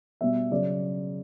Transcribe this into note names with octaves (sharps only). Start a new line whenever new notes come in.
B2 G3 B3 E5
C#3 F#3 D5